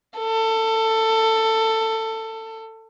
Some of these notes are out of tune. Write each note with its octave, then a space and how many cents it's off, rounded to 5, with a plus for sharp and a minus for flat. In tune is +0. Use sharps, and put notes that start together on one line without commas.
A4 +20